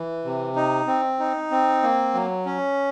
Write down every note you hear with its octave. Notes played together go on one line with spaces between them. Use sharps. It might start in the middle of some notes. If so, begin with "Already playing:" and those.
Already playing: E3
C3
D#4
C4
D#4
C4
A#3
F#3
C#4